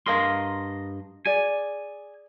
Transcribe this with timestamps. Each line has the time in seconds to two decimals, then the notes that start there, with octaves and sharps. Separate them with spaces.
0.06 G2 A#4 D#5 F5 A#5 C6
1.26 G#4 D5 G#5